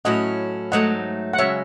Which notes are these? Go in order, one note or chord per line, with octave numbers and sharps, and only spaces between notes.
A2 F#3 C#4 E4 D#5 F#5
G#2 F#3 A3 D#4 D#5 F#5
F#5
F#2 C#3 G#3 C#5 E5